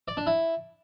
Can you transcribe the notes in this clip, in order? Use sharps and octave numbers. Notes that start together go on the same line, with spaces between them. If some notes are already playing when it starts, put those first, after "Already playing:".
D5
D4
E4